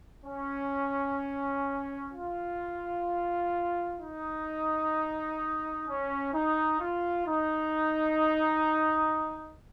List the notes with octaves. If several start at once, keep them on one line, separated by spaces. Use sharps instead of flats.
C#4
F4
D#4
C#4
D#4
F4
D#4